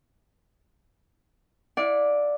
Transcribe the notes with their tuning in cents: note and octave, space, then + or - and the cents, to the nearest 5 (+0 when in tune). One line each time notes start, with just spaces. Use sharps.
E4 +0 D5 +0 F#5 -45